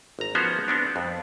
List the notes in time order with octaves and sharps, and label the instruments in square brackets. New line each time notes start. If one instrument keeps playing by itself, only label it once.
[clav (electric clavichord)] G#1 A#5
F3 B3 C#4 F#4 C5 C#5
B3 C4 D4
F2